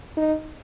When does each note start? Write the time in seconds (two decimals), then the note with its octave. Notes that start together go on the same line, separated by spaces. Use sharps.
0.17 D#4